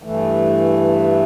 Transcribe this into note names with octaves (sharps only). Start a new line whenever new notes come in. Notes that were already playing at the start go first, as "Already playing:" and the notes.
G2 E3 A3